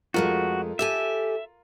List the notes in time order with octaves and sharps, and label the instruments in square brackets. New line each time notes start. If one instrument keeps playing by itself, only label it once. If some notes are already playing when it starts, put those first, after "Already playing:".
[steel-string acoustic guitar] F2 G#3 A3 [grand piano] F4 A#4 [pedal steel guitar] F#4
[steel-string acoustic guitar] G4 A4 G#5 [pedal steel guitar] E5